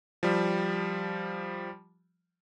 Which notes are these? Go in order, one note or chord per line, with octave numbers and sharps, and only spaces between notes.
F3 G3